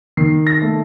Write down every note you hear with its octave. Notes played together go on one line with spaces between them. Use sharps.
D#3 C7
A#6
A3